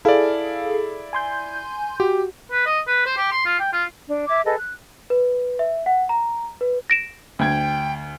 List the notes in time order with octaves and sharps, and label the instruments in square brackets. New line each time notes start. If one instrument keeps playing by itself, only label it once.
[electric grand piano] E4 D5 [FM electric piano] G#4 A4 F5
[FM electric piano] G#5 C6 G6
[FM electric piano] F#4 [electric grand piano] G4
[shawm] B4
D#5
B4
C5
G4
C6
F4
G5
F4
[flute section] D4
E5 D6 G#6
G#4 A4 B4 D#5
F#6
[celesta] B4
E5
F#5
A#5
B4
[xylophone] A#6 D7 E7
[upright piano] D2 G#6 [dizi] G5